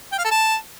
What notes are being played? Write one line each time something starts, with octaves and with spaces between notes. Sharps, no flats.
G5
F5
A4
A5